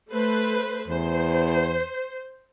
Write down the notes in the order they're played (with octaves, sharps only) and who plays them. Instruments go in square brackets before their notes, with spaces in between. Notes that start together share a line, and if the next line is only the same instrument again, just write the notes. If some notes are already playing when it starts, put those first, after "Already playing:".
[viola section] A3 B4 C5
[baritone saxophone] E2 [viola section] C5